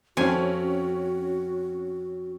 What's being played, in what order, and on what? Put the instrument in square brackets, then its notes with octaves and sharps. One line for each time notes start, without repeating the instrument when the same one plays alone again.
[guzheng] F2 G#5 [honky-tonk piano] C4 C#4 [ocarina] F#4